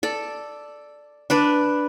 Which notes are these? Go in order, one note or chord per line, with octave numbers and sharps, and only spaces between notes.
A4 D5
D4 B4 D5